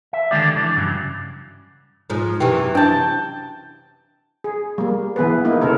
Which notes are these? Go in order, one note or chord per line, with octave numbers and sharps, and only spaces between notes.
E5
D3 D#3 G#3 D4 G4 D5
E3 D4 D5
G2 C#3 F#3
G#2 F3
F#2 C3 E3 G4 G5
D4 G5 A5
G#4
G3 A#3
E3 B3 G#4 B4
A#3 D#4 E4
C#3 B3 A4 A#4